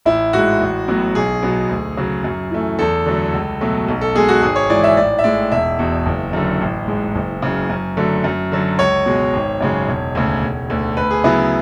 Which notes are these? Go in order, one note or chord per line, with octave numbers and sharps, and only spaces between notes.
A1 E4
G#2 G#3 F#4
A1
A2 F#3 B3
B1 G#4
B2 F#3 B3
D2
C#3 F#3
F#2
E3 A3
E2 A4
D3 F#3 A3
C#2
B2 F#3 A3
B1
A4
B2 G#3 G#4
F#4
G#1 G#4
C#5
G#2 E3 D5
E5
A1 D5
E5
A2 G#3 D5
E1 E5
E2 B2
F#1
F#2 D3
A1
G#2 G#3
F#1
F#2 C#3
F#2
D3 F#3 A3
F#2
D3 F#3
C#2 C#5
B2 G#3
G#1
F#2 C#3 G#3
E1
D2 C#3
E1
D2 D3
D2 B4
G#4
C#3 F#3 B3 E4